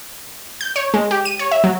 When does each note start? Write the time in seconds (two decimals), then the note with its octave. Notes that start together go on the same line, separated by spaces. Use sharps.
0.61 G6
0.76 C#5
0.94 G#3
1.11 G4
1.25 D#7
1.39 C#5
1.51 E5
1.64 F#3